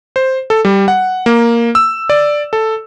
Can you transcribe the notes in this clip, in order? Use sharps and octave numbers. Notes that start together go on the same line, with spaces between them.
C5
A4
G3
F#5
A#3
E6
D5
A4